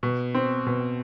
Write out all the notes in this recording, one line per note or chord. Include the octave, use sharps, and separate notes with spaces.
B2
C4
B2